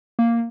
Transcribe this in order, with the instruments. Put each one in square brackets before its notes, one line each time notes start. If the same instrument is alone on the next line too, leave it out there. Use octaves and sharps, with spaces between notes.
[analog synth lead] A#3